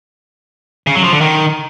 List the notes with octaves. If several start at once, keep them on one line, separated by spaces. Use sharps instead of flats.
C#3
F#3
F3
D3
D#3